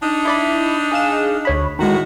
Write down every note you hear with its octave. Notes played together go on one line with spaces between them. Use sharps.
D4 D#4
E4 D5 B5
G#4 F5 E7
D2 C#5 B5
A2 D#3 G#3 F#4